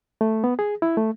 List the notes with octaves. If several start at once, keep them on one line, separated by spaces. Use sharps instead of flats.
A3
B3
G#4
E4
A3